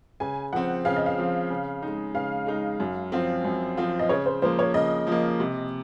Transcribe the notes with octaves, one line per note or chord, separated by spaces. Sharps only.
C#3 G#5
F3 C4 F#5
C#3 F5
D#5
F5
F3 C4
C#3
G#3 D#4
C#3 F5
G#3 D#4
F#2
F3 C4 F4
F#2
F3 C4 F4
D#5
C#3 C#5
C5
F3 A#3 C5
C#5
C#3 D#5
F3 A#3
C3